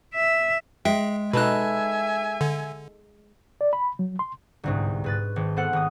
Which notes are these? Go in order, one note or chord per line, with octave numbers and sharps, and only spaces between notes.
E5
G#3 E5 G5
B2 D#4 A4 B4 E5 G#5 F#6
D3
D5
B5
F#3
C6
G1 C2 G#2
G#2 B4 A6
G#1
B3 A4 C5 F#5
G#1 D#6